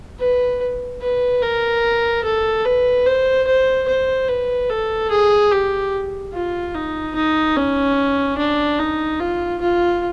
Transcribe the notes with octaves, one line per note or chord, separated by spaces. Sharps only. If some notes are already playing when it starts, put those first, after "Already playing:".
B4
B4
A#4
A4
B4
C5
C5
C5
B4
A4
G#4
G4
F4
D#4
D#4
C#4
D4
D#4
F4
F4